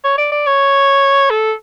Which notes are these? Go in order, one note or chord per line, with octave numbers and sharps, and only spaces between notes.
C#5
D5
D5
C#5
A4